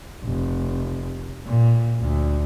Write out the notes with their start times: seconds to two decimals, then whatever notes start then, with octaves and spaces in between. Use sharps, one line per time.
0.25 F1
1.46 A#2
2.00 D2